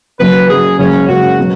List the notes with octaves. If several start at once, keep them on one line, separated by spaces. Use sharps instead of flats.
F#1 F#2 F#3 B4
F#1 F#2 F#3 G#4
F#1 F#2 C#3 G#3 C#4
F#1 F#2 C#3 G#3 F#4
B2 F#3 B3